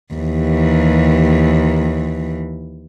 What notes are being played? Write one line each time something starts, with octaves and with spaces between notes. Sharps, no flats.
D#2 E3